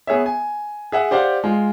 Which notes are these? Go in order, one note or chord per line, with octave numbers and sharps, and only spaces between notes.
B3 G#4 C#5 E5
G#5
G#4 E5 F#5
G4 C5 D5 F5 F#5
G#3 F4